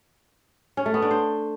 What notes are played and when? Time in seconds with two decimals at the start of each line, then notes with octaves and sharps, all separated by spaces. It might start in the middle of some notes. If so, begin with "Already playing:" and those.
0.77 C#4
0.86 A3
0.94 B3
1.02 D4
1.11 C5